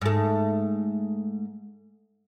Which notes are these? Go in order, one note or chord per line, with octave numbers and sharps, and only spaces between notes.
G#2 A3